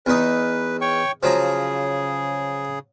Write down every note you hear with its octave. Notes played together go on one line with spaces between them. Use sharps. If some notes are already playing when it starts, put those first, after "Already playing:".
E2 D#4 B4
C#5 G5 C#6
C#3 F3 F#3 G#4 A#5